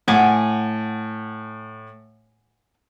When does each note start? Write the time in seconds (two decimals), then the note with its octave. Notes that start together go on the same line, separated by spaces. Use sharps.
0.08 A2 F#5 G#5 D6